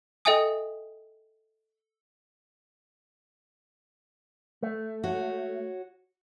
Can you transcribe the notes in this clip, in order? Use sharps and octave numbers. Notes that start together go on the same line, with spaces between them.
A4 D#5 E5 G5 G#5 D#6
A3
F#4 C#5